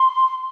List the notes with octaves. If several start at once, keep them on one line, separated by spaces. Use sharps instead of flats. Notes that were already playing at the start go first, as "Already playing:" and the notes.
Already playing: C6